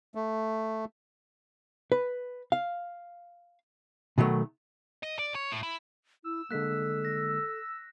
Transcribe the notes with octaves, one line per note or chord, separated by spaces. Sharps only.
A3
B4
F5
B2 D#3 F#3 A3
D#5
D5
C#5
A2
E4
E4 E6
D3 G#3 A#3 A4 F#6 B6
A#6